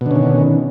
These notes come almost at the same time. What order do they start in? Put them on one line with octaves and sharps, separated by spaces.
B2 D3 C#4 D#3